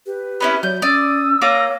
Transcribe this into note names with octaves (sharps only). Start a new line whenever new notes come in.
G4 B4
B3 C#4 E4 B5
F#3 C#5 D5 G6
C#4 D5 D#6 E6
A#3 F4 C#5 D6 A#6